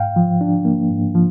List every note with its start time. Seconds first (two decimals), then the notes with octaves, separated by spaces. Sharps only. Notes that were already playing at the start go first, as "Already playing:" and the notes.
Already playing: G#2 F5 G5
0.16 F3
0.41 D4
0.65 A#3
0.91 G#2
1.15 F3